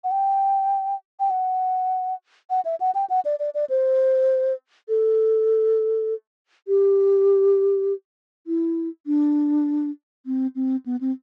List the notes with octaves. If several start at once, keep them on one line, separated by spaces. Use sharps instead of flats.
F#5
G5
G5
F#5
F#5
E5
F#5
G5
F#5
D5
D5
D5
C5
A4
G4
E4
D4
C4
C4
B3
C4